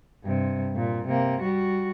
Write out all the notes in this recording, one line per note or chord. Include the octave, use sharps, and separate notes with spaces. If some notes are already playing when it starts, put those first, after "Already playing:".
G2 C3
A#2
C3 A#3
G3 F#4